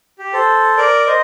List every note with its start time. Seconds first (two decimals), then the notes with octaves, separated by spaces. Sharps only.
0.19 G4
0.33 A4 C5
0.77 A#4 D5
1.07 C5 D#5